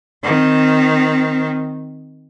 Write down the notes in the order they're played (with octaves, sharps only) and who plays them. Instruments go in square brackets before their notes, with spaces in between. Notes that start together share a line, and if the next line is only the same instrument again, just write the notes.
[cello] D#3 C4